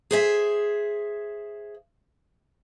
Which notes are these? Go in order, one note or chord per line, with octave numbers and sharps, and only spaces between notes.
G#4 C5 E5